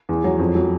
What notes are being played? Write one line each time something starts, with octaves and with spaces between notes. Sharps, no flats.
E2
F#3
F2
F#3